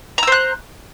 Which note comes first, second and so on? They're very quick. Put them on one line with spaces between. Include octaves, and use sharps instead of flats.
A#5 E6 C5 F#6